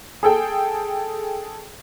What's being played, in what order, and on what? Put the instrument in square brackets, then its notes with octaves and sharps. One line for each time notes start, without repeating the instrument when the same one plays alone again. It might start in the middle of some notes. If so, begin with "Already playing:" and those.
[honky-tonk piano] G#4 A4 G5